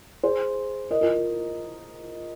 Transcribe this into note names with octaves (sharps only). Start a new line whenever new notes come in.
G#4 C5
A#4 D#5
F4 A#4